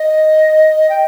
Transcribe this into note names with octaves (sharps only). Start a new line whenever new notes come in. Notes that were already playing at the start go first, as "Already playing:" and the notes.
Already playing: D#5
G5